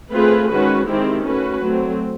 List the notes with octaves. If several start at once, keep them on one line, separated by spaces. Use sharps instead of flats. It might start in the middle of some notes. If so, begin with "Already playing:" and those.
A3 C4 F4 G#4 B4
D#3 G#3 C#4 F#4 B4
D#3 G#3 C4 E4 G4
A3 C#4 F#4 B4
F#3 A3 C4